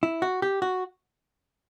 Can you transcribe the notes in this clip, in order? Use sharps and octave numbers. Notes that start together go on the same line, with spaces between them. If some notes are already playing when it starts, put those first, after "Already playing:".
E4
F#4
G4
F#4